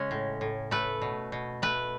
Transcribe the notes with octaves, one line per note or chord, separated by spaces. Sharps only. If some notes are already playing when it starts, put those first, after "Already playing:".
Already playing: C#3 G#3 C#4
A2
A2
A3 B4
B2
B2
A3 B4